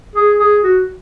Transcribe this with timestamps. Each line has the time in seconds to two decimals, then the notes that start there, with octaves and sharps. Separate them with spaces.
0.15 G#4
0.39 G#4
0.64 F#4